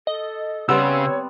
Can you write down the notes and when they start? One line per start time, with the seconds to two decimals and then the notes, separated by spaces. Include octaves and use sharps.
0.07 A4 D#5
0.69 C#3 G3 B3 C4 C#5 E6